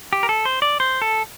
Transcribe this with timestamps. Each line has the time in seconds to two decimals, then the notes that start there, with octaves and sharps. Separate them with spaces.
0.13 G4
0.23 A#4
0.29 A4
0.45 C5
0.62 D5
0.80 C5
1.02 A4